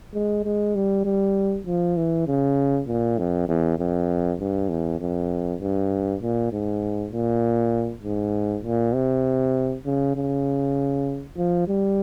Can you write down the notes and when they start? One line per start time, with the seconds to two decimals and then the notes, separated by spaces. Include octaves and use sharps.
0.14 G#3
0.44 G#3
0.75 G3
1.05 G3
1.67 F3
1.97 E3
2.26 C#3
2.87 A#2
3.18 F2
3.48 E2
3.78 F2
4.40 G2
4.69 E2
5.00 F2
5.60 G2
6.22 A#2
6.52 G#2
7.12 A#2
8.03 G#2
8.64 A#2
8.94 C3
9.85 C#3
10.15 C#3
11.37 F3
11.68 G3